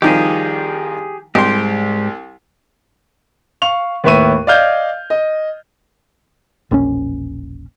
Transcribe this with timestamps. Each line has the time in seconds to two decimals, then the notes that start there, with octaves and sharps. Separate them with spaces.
0.02 C2 D#3 F3 G4 G#4
1.35 C2 G#2 G4 C6
3.62 F5 C#6 F7
4.04 D#2 A2 B4 E5 C#6 D#7
4.47 D5 D#5 F5 F6 G6 G#6
5.10 D#5
6.71 E1 A#1 C4 C#4